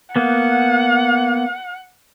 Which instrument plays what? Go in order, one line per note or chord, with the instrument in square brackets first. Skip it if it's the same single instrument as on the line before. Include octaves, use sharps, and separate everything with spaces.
[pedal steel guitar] A#3 B3 [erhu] F#5